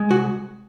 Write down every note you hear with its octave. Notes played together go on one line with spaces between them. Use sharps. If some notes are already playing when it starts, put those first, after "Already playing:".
Already playing: G#3
C2 F#4